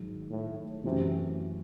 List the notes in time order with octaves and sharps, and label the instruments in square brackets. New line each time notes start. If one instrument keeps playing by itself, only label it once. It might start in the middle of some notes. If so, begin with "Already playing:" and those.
Already playing: [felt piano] G#2 D#3 F#3
[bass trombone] A2
[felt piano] F#2 E3 A3 C#4 F#4 [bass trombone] C3